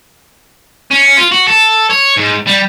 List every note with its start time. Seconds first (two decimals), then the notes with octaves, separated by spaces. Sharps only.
0.91 C#4
1.17 F4
1.32 F#4
1.48 A4
1.90 C#5
2.17 G#2
2.47 G3